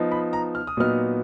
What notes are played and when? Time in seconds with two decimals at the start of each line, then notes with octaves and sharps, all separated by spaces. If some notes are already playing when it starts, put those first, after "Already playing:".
Already playing: F3 B3 D#4
0.12 B5
0.33 A#5
0.55 F6
0.67 D#6
0.77 A#2 F#3 B3 D#4 F6